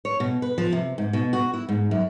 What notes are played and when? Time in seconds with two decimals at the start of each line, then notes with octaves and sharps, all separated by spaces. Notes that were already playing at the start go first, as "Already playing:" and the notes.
0.05 C#5
0.20 B2
0.42 B4
0.58 F3
0.73 C3
0.98 G#2
1.13 B2
1.33 F#4
1.54 E4
1.69 G#2
1.91 F#2